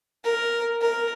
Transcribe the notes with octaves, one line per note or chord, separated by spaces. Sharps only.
A#4
A#4